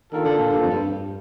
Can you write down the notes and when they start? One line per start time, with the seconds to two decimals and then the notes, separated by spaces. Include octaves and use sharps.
0.12 D#3 A#3 D4 F4 A4
0.25 D3
0.39 A#2
0.51 G2
0.62 F2
0.71 G2
0.90 G2